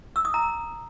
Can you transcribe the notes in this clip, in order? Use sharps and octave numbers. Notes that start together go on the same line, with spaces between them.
E6
D#6
A#5